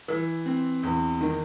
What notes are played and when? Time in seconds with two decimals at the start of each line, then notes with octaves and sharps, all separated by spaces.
0.08 E3
0.46 C4
0.83 E2
1.21 D#3